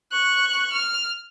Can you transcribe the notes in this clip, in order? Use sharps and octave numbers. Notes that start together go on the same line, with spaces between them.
C#6 F#6
F6